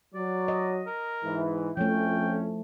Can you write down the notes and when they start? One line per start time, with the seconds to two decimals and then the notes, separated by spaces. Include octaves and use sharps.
0.15 F#3 D5
0.48 D#5
0.87 A#4
1.24 G#2 E3
1.77 F2 F3 A3 C#4 G5